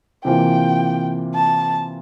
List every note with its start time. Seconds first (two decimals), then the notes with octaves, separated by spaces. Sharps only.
0.24 C3 E3 A#3 F4 G5
1.35 A5